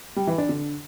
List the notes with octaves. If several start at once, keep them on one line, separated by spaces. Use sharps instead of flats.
G3
E3
D4
D3